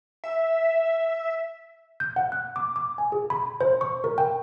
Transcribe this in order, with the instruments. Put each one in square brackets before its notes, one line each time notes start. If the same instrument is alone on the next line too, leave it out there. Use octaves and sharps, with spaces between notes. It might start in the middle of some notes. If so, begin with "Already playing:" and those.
[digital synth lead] E5
[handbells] G6
F#5
F#6
D6
D6
G#5
G#4
B5
C5
C#6
A#4
G5